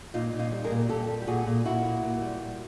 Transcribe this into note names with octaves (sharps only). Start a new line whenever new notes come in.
A#2 D#4 F4
A#2
D#4 F4
G3
G#4 A#4
A#2
A#2 G4 A4
G3
G4
A#2 F#4 G#4
A#2
A#2 E4 F#4
A#2
A#2
G3
G3